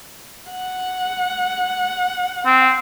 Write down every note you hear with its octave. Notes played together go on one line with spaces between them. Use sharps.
F#5
C4